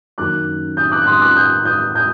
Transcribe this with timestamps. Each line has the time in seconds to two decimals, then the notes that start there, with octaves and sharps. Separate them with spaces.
0.18 F#2 D#3 F#3 A#3 D6 F#6
0.77 D#6 G6
0.91 D6 F#6
1.02 F#6
1.06 C6 D#6
1.21 D6 F#6
1.35 D#6 G6
1.65 D#6 G6
1.95 D#6 G6